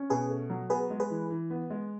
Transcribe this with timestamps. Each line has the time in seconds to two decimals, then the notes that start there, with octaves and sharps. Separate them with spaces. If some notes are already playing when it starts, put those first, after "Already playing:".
Already playing: C#4
0.10 B2 G#4 B4
0.30 A3
0.50 F#3
0.70 B3 G#4 B4
0.90 G#3
1.00 G#4 B4
1.10 E3
1.30 E3
1.50 B3
1.70 G#3